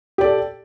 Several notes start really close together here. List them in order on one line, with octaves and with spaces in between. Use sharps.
G4 D5 A4